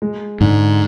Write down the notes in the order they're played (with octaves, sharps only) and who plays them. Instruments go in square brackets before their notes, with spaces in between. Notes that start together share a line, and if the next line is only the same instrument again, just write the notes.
[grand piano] G#3
[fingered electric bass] G#2 [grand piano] D3